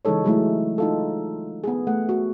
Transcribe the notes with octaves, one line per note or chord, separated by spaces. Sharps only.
C#3 E3 G#3 D#4 A4 C#5
F#3 G#3 A3 E4
D#4 F4 A4
B3 G#4
A3 F#5
F#4